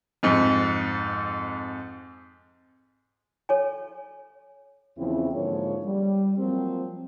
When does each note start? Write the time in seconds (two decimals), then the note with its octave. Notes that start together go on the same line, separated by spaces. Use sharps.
0.23 F2 G#2
3.49 A4 C#5 G#5
4.98 E2 C#3 F3 C4 E4
5.33 G#2 D3 F3 A#3 C#5
5.85 G3
6.39 F3 F#3 A#3 C4